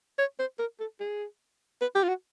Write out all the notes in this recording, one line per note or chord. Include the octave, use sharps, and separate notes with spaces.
C#5
C5
A#4
A4
G#4
B4
G4
F4
F#4